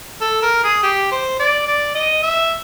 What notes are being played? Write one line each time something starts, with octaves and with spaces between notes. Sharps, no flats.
A4
A#4
G#4
G4
C5
D5
D5
D#5
E5